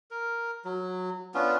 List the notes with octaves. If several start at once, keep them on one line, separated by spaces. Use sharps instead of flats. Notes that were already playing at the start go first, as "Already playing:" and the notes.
A#4
F#3
B3 C#4 D4 F4